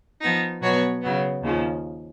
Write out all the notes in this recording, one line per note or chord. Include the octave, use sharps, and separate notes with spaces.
F3 B3 D#4
B2 F#3 B3 F#4 C#5
C#3 F#3 B3
D#2 C#3 F3